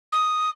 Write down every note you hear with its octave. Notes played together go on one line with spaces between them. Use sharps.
D#6